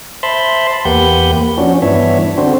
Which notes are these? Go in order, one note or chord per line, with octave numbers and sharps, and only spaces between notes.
C5 E5 A5 B5 C6
E2 A#3 G4 B4 F#5 G6
F3 C#4 D4 F#4
G2 E3 B3 D4 C#5 E5
D3 C4 D4 F#4 C5